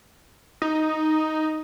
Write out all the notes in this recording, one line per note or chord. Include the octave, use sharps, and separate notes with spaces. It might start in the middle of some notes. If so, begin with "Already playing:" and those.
D#4